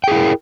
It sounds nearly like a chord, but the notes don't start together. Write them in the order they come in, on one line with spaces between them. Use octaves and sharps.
G5 G#4 E4 A#4